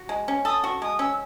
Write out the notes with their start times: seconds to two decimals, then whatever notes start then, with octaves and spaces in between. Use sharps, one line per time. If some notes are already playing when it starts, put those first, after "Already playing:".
Already playing: F#4
0.09 G#3
0.28 C#4
0.45 A4 D#6
0.64 F#4 C#6
0.82 G#3 D#6
0.99 C#4 E6